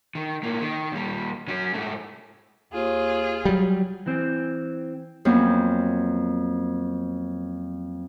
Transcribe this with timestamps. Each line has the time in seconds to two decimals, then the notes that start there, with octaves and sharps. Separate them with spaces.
0.15 D#3
0.43 A2 A#3
0.62 D#3
0.92 D#2 G3
1.48 F#3 C#4
1.74 G#2 A3
2.73 D#2 F4 G#4
3.45 F#3 G3
4.06 E3 C4
5.25 F2 F#3 A#3 B3 C#4 C5